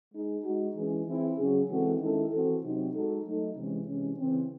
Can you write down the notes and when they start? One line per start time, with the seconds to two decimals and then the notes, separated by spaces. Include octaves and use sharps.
0.12 G#3 D#4 G#4
0.43 G#3 D#4 F#4
0.74 E3 G#3 C#4 E4 G#4
1.05 E3 C4 E4 G#4
1.37 C#3 F#3 C#4 G#4
1.68 E3 G#3 C4 F#4 A4
1.98 D#3 G#3 C#4 E4 A4
2.30 E3 C4 F#4 A4
2.62 C3 F#3 C4 D#4
2.92 G#3 D#4 F#4 A4
3.24 F#3 A3 D#4 A4
3.55 C3 E3 G#3 C#4
3.86 C3 E3 G#3 C#4
4.17 C#3 E3 C4